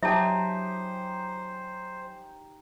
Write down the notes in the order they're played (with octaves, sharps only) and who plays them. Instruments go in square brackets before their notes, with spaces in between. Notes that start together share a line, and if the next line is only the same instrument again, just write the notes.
[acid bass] F#3 [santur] D#4 G4 G#5 [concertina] C5 [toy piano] E5 A5